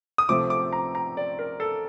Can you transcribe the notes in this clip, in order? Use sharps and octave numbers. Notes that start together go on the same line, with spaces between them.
D#6
C3 F3 A3 C4 D6
D6
A#5
A#5
D5
A#4
A4